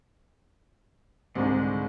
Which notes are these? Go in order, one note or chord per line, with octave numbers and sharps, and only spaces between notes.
C2 G#2 D3 D#3 G#3